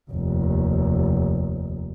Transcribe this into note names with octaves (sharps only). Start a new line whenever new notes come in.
F1 D#2